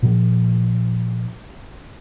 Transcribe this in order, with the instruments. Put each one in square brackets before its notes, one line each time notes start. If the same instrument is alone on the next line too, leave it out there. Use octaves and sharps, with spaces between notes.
[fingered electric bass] A#2 F3